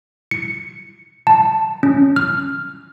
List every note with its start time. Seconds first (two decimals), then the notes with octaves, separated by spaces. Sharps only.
0.31 C#7
1.27 A5
1.83 C#4
2.16 F6